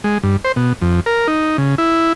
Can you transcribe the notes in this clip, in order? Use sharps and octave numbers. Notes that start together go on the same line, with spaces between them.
G#3
G2
C5
B2
F2
A#4
D#4
C#3
E4